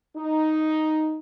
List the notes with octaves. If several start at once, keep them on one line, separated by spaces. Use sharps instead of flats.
D#4